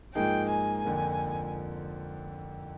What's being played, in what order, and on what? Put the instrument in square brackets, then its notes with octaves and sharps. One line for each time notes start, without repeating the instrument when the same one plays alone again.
[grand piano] G#2 F3 A#3 D#4 G#4 [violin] G5
[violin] G#5
[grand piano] F2 D3 F3 A#3